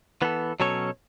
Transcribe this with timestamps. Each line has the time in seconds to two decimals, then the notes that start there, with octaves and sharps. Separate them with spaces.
0.22 E3 B3 A4
0.60 B2 F#3 C#4 A4 C#5